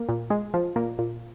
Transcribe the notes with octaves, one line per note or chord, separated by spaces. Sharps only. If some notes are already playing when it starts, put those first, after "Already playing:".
Already playing: A#3
A#2
G#3
F3
A#2 A#3
A#2